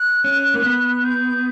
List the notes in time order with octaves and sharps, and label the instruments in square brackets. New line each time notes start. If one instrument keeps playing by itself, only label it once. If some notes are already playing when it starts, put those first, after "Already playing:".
Already playing: [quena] F#6
[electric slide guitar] C#4
A#3
B3
[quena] G6